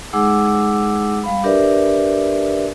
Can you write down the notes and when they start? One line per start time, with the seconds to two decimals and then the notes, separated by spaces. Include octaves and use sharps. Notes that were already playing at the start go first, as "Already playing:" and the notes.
0.13 G#3 D#4 G#4 F#5 D6 E6
1.23 G3 F5 B5
1.44 D4 G4 A#4 B4 D5 E5